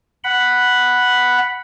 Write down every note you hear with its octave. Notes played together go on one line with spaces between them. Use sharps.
F#5 B5